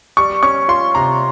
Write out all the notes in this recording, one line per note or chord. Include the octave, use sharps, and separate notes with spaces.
G3 C#6
C#4 C#6
F4 C6
C3 A#5